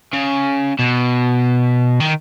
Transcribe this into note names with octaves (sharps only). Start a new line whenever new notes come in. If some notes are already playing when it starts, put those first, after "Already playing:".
C#3
B2
D#3